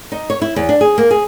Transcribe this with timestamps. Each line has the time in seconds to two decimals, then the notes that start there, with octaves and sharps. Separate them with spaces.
0.12 D#4
0.30 C#5
0.42 E4
0.56 E2
0.69 D4
0.81 G#4
0.98 A#3
1.11 G#4